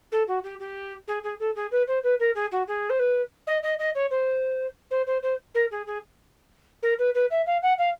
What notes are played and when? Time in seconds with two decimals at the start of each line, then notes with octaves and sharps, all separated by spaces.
0.11 A4
0.27 F#4
0.43 G4
0.59 G4
1.07 G#4
1.23 G#4
1.39 A4
1.55 G#4
1.71 B4
1.87 C5
2.03 B4
2.19 A#4
2.35 G#4
2.51 F#4
2.67 G#4
2.89 C5
2.99 B4
3.47 D#5
3.63 D#5
3.79 D#5
3.95 C#5
4.10 C5
4.90 C5
5.06 C5
5.22 C5
5.54 A#4
5.71 G#4
5.86 G#4
6.82 A#4
6.98 B4
7.14 B4
7.30 E5
7.46 F5
7.62 F#5
7.78 F5